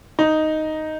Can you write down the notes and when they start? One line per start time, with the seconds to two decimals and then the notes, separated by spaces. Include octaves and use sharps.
0.19 D#4